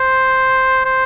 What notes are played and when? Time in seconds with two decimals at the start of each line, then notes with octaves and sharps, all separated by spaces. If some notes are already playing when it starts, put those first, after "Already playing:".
Already playing: C5
0.85 C5